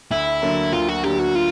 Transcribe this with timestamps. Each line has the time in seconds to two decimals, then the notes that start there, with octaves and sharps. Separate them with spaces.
0.11 D2 E4
0.42 D3 F#3 A#3
0.72 D2 F4
0.89 F#4
1.04 D3 F#3 A#3 G4
1.19 F#4
1.35 F4